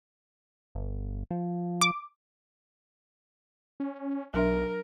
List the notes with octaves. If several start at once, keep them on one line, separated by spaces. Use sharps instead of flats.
G1
F3
D6
C#4
B1 F#3 D4 A#4 E5